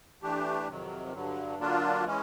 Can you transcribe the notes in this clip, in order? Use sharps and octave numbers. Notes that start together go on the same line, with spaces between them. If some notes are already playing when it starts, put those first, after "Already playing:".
E3 A3 D4 G4
F2 C3 D#3 F#3
G2 D3 F#3
D3 F#3 A#3 D4 F4
E3 G#3 C#4